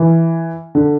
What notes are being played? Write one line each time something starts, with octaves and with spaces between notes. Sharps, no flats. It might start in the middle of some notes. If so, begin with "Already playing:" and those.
Already playing: E3
D3